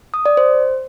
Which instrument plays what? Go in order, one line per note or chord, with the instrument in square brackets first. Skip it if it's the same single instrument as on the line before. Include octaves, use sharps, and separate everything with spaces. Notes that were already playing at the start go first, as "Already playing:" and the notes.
[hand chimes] D#6
D5
C5